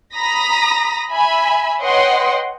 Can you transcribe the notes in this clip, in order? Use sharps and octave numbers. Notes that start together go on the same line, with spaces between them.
A#5 B5 D#6 A#6 B6
E5 G#5 B5
B4 C#5 D#5 F#5 G5 C6